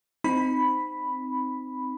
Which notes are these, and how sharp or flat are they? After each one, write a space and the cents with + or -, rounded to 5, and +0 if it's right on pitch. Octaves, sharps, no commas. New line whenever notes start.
C4 -15 D#4 -5 B5 +0